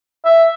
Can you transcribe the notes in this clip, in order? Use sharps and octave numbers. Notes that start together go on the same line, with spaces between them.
E5